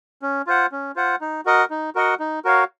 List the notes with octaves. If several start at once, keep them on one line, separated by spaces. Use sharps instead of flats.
C#4
F4 C5 F#5
C#4
F4 C5 F#5
D#4
F#4 A#4 D#5 F#5
D#4
F#4 A#4 D#5 F#5
D#4
F#4 A#4 C#5 F5